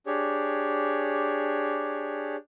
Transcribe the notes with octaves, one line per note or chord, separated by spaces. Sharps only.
D4 G4 G#4 C#5